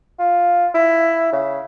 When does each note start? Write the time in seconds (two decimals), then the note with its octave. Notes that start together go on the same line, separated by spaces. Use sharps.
0.19 F4
0.74 E4
1.32 C#3